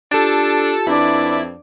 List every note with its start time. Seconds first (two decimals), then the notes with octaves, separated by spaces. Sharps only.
0.12 D4 F4 G4 A4 A5
0.87 F2 D4 E4 B4 D5